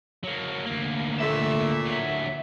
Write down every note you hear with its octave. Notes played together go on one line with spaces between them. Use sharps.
F#3 A#3
D2 A#3
A#2 A3 E5
D2 F#3